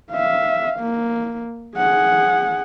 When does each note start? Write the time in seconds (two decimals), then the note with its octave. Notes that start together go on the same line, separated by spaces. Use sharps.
0.11 E5 F5
0.80 A#3
1.77 G#4 F#5